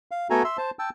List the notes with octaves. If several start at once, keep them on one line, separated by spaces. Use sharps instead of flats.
F5
A3 B3 F#4 A4 G#5 A#5
E5 C6 E6
C5 A5
G5 A5 E6